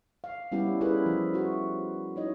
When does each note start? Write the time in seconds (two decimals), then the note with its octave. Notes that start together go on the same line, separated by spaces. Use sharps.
0.24 F5
0.52 G3 B3 C#4 E4 G4
0.81 C#4 E4 F4 G#4 A#4 B4
1.06 F3
1.34 F4 F#4
2.16 D#4 E4 C#5 D#5